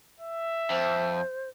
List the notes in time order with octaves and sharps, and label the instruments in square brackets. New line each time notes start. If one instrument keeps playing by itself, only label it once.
[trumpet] E5
[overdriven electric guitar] F2 [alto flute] C5